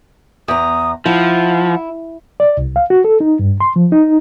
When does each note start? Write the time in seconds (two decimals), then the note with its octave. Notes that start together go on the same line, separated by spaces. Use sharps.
0.48 E2 A#5 D#6
1.06 F3 E4 F#5
2.40 D5
2.57 C2
2.76 F5
2.90 F#4
3.04 A4
3.20 D#4
3.39 G2
3.60 C6
3.76 F3
3.92 D#4